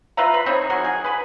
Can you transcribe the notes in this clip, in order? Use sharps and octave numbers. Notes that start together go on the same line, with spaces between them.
F4 B4 E5 A#5
B5
C4 D#4 C#5
F#3 F#4 G#4 A#4
G#4
B4 G#5 B5